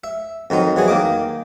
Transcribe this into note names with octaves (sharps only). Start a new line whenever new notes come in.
E5
F2 D#3 F#3 D#4
E3 F#3 G#4
D#3 A#3 D#5 D6